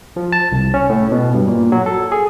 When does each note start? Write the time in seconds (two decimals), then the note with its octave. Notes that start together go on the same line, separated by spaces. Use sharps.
0.16 F3
0.32 A5
0.52 C2
0.74 C#4
0.89 A2
1.12 B2
1.35 G2
1.48 A#2
1.72 F#3
1.86 A4
2.12 G#4